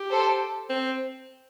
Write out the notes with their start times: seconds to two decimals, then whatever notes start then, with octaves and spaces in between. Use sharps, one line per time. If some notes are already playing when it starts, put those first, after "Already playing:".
Already playing: G4
0.11 A4 C5
0.70 C4